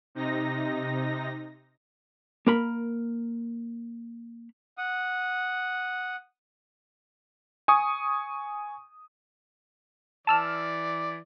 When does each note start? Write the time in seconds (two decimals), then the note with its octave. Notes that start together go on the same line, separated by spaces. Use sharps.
0.15 C3 D#4 A#6
2.47 A#3 A#4 B5
4.78 F#5 D#6
7.68 G#5 C#6 D#6
10.27 E3 D5 A5 E6 F6